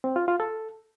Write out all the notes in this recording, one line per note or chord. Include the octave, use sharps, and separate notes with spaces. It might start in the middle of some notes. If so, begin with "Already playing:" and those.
C4
F4
F4
A4